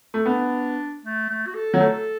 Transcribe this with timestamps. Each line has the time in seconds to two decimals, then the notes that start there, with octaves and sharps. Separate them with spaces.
0.14 A3
0.26 B3 D4
1.03 A3
1.29 A3
1.46 F#4
1.54 A4
1.74 F#3
1.80 A3 A4